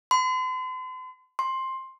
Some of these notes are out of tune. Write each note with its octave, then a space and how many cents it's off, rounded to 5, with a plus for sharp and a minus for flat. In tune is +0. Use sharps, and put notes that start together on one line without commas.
C6 -45
C6 +10